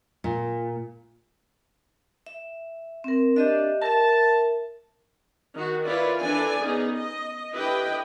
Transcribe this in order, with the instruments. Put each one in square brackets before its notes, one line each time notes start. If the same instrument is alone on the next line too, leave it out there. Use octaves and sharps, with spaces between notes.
[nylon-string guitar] A#2
[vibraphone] E5
C4 A#4
[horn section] D4 [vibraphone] G4 D#5 E5
[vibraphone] A#4 E5 [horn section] A5
[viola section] D#3 F#4
E4 F4 B4 C#5 D5
E3 D4 A4 D5 G#5
B3 C#4 D#4 G#4
D#5
D3 E4 G4 B4 D#5 G5